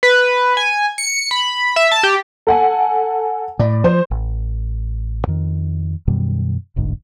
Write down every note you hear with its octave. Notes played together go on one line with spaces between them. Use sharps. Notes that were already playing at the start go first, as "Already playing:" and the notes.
B4
G#5
C#7
B5
E5
A5
G4
A4 F#5 G#5
A2 D5
F3 C5
A1
F2 D#3
F#2 B2 D#3 G3
E1 A1 G#2 D3